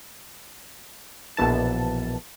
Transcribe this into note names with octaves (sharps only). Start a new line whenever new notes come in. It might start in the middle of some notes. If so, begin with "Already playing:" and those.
A#1 B2 E3 A5